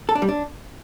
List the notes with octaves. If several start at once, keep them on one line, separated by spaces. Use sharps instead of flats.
A4
D4
G3
D4